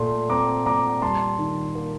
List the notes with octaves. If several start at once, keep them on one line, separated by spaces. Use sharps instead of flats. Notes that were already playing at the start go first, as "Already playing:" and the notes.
Already playing: A#2 A3 C6
C4 A#5 D6
A#2 A#5 D6
G3 A5 C6
D#3
A#3